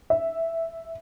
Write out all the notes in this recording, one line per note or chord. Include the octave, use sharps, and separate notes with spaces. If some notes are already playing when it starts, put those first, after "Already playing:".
E5